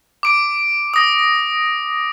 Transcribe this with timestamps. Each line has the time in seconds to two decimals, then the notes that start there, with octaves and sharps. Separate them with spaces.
0.23 D6 D7
0.94 D#6 A#6